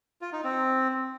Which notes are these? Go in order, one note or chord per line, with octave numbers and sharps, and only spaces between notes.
F4
D#4
C4